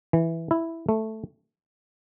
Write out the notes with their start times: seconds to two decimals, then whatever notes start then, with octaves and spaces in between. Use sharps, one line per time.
0.13 E3
0.51 E4
0.89 A3